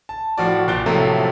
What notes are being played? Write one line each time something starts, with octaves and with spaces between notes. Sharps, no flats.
A5
A2 F3 F#4 D5
A#1 A#2 F#6 A6 D7 G7
A2 C3 F3 F#3 A3 A#3